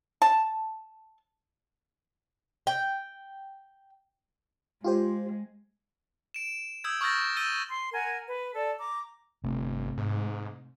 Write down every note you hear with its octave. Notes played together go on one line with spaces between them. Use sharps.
A5
G5
G#3 F4 G4 C5
D7 E7
D#6 E6 G6 G#6
C#6 D#6 F6 G6 A6 A#6
E6 G6 A6 D#7 G7
C6
A#4 F#5 G#5
B4
A4 D5 A5
A#5 D6
G1 C3 A3
G#2